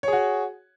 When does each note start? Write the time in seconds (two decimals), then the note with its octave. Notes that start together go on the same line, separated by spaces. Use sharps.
0.03 C#5
0.08 G#4
0.13 F#4